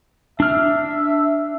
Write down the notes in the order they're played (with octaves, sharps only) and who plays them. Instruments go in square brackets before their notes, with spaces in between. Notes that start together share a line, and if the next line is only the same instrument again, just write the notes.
[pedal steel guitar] D4 F6 [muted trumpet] E5